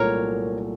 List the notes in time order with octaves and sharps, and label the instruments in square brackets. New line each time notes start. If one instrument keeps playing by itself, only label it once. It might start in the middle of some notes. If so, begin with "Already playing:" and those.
Already playing: [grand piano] C2 A#2 F#3 A3 [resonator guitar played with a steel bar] A#4 C#5